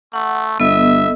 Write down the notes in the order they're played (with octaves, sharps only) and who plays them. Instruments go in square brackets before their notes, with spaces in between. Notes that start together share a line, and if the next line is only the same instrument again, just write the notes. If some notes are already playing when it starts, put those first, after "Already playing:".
[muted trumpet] A3 [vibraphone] F#5
[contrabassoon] G1 [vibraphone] B3 A4 D#5 [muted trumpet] E5